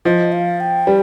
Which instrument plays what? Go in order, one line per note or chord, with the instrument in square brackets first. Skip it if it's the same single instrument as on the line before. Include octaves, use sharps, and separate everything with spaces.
[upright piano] F3 [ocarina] D#5
[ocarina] F5
G5
[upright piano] G3